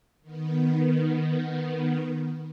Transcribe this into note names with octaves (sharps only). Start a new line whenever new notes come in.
D#3 B3